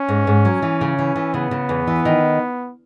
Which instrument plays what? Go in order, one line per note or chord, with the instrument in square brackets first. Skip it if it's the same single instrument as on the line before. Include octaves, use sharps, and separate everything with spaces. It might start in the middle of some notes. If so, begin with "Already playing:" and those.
Already playing: [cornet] C#4
[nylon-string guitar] G#2
G#2
F#3
E3
C#3
E3
E3
[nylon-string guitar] C#3 [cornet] B3
[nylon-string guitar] C#3
E2
E3
D#3